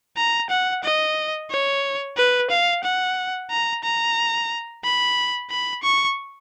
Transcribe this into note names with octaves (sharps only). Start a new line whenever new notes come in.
A#5
F#5
D#5
C#5
B4
F5
F#5
A#5
A#5
B5
B5
C#6